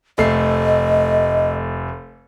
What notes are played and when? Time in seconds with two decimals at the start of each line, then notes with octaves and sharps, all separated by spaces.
0.18 F1 A3 D#5 C7